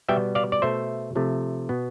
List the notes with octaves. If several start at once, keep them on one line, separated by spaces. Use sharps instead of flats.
B2 G3 B3 E5 G5
D5 F5
D5
B2 A3 C5 E5
C3 F3 A3
B2 B3